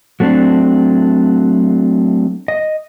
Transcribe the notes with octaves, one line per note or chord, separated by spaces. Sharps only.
F#3 A3 C4 D4
D#5